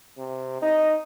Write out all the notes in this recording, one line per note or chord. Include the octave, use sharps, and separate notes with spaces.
C3
D#4 D#5